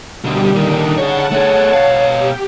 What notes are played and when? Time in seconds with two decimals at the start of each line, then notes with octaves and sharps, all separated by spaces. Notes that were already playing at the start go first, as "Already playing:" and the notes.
0.24 B2 D3 G3 G4
0.55 A#2 D3 D#3 D4 D#4
0.98 G#4 C#5 F#5 A5
1.32 A3 G#4 C#5
1.73 B2 F5
2.07 G4